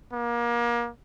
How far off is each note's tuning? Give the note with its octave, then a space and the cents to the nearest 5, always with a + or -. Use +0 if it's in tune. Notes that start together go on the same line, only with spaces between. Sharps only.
A#3 +30